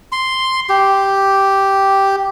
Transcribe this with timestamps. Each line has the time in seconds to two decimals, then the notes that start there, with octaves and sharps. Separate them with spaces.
0.12 C6
0.69 G4